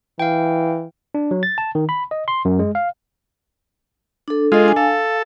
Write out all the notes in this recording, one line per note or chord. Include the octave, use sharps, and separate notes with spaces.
E3 F5 G5
D4
F#3
A6
A5
D#3
B5
D#5
C6
F#2
G#3
F5
D4 A4
G#3 F4 A4 D#5
D4 G#5
A4 F5